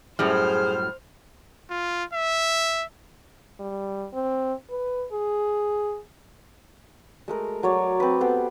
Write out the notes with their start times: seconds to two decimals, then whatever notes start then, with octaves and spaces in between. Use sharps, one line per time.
0.19 F#2 A2 G3 G#4 C5 F6
1.70 F4
2.13 E5
3.60 G3
4.13 C4
4.70 B4
5.12 G#4
7.28 G#3 A3 A#4
7.63 F#3 C#5 D5
8.00 C4 B4
8.21 B3 G4 A4 C5